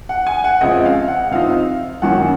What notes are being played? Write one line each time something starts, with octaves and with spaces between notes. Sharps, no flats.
F#5
G#5
F#5
C#2 C3 F3 D#5
F5
F#5
C3 F3 C4 D#4 F5
F#2 D#3 F#3 A#3 C#4 F#5